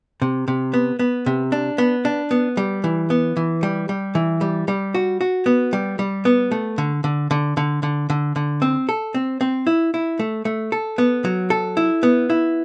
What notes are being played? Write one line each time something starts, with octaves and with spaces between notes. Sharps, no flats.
C3
C3
B3
B3
C3
D4
B3
D4
B3
G3
E3
B3
E3
G3
G3
E3
G3
G3
F#4
F#4
B3
G3
G3
B3
A3
D3
D3
D3
D3
D3
D3
D3
C4
A4
C4
C4
E4
E4
A3
A3
A4
B3
F#3
A4
E4
B3
E4